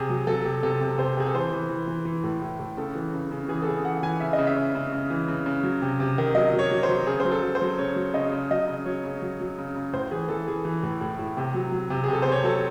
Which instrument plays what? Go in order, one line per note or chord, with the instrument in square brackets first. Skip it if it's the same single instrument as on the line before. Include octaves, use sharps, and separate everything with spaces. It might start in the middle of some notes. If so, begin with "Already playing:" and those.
Already playing: [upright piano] C3 G#4
F#3
F#3 A4
C3
C3 A4
C3
C3 C5
C3 G#4
A4
E3 C5
E3
E3
E3
E3
A2
A2
A2
C#3 A4
E3
C#3
C#3
E3 G#4
A4
C#3 G#4
E3 F#5
E3 G#5
C#3 E5
D#5
C#3
E5
C#3
C#3
C#3
E3
C#3
C#3
F#3
C3
C3
D#3
F#3 D#5
F#3
C#5
F#3
C5
F#3
C#3 G#4
C5
F#3
A4
F#3
C5
F#3
C#3 C#5
F#3
C#3 D#5
C#3
F#3 D#5
C#3
F#3 C#5
C#3
F#3
F#3
C#3
C#3
A2 C5
E3 G#4
E3 A4
E3 G#4
E3
A2
A2
A2
C3
F#3
F#3
C3
G#4
C3 A4
C3 C5
C#5
F#3 A4